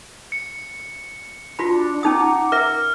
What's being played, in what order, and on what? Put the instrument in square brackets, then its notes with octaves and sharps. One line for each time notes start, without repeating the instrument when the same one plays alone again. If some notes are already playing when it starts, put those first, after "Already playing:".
[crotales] C#7
[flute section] D4 [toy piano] F4 F#4 B5
[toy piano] C#4 D#4 D#6 [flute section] F#5 A#5 D6
[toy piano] A#4 E5 [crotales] F6